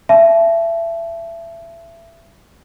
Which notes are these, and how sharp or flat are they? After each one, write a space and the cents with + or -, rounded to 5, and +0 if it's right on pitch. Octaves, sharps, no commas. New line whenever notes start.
E5 +25 A5 -25